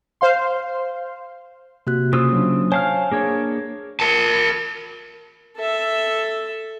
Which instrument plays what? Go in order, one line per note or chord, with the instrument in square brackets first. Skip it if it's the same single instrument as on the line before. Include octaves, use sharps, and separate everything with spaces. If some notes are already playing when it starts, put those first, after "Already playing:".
[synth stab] C5 F5 C6
[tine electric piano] C3 [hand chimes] A#3 F#4 F#6
[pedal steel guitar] C#3 F4 E6 [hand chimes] A#3 C5 D#6
[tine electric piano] F#3 D4
[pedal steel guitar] C5 F5 F6 [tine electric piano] C#5 A5 [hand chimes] G#5
[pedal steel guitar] A#3 D4 C#5 [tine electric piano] G#4
[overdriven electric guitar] A#4 A5
[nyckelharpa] A4 E5